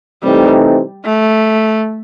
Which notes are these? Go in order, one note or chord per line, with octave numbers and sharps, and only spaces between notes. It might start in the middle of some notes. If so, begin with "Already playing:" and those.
C3 E3 G3 A3 C4 D#4
A3